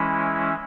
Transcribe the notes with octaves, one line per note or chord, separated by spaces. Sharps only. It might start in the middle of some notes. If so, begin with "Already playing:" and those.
Already playing: E3 G#3 C#4 E4